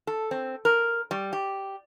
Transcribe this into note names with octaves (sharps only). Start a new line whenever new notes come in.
A4
C4
A#4
G3
G4